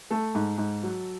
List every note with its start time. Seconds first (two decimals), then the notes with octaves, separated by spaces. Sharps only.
0.11 A3 A4
0.35 G#2
0.58 G#2
0.83 F#3